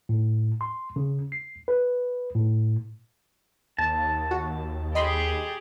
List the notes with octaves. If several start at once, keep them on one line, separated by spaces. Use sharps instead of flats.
A2
C6
C#3
C7
B4
A2
D#2 A5
F#4
G4 G#4 D#5 B5 C6